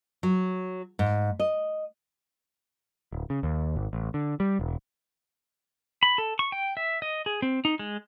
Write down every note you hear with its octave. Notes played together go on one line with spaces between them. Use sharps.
F#3
G#2
D#5
D1
C#3
D#2
G#1
A1
D3
G3
E1
B5
A4
C#6
G5
E5
D#5
G#4
C4
D#4
G#3